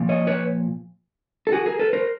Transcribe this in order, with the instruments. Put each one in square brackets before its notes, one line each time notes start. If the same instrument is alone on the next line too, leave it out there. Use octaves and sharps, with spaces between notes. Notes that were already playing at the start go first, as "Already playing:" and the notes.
Already playing: [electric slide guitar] A#2 F3
C#5 D#5
B4 C#5
A4
F#4 G#4
G#4 A#4
A4 B4
A#4 C5